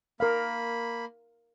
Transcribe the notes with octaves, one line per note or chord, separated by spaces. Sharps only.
A#3 A#4 F5 B5